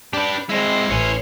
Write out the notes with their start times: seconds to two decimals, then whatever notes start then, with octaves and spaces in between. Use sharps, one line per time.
0.13 D4 G4 B4
0.49 G#3 C4 E4 C5
0.90 A1 C#5 G#5